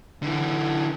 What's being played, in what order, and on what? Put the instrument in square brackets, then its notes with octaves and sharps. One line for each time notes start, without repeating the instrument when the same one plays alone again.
[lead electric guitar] D3 E3